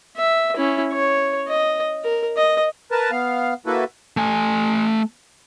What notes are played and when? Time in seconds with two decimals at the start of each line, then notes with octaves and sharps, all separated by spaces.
0.17 E5
0.57 C#4 E4
0.92 C#5
1.48 D#5
2.04 A#4
2.37 D#5
2.91 A#4 B4 A5
3.11 B3 F5
3.66 A#3 E4 F#4 A4 B4
4.17 A3 G#5